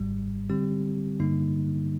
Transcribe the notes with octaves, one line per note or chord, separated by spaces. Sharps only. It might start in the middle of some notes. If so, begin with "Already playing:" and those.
Already playing: G#1 G#2 G3
D3 G3 C4 G4
G2 D3 G3 A#3 D#4